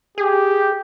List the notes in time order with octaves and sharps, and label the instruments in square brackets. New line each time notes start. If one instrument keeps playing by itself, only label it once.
[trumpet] G4 [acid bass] G#4